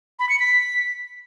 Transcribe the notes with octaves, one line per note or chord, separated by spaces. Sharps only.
B5
C#7
B6